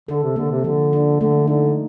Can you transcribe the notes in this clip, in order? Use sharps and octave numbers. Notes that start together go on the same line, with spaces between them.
D3 A4
C3
D3 A#3
C3
D3 F3
D4
D3 A3
D3 D#4